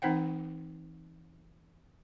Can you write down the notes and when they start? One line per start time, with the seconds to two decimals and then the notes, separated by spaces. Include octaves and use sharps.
0.02 E3 C4 D#4 C5 F#5 G5